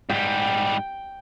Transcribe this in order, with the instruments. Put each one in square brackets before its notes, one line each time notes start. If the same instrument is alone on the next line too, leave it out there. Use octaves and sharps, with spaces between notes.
[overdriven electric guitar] G#2 G3 [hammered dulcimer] G5